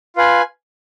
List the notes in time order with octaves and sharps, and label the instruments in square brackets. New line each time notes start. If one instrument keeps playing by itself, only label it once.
[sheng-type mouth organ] F4 B4 F5 G#5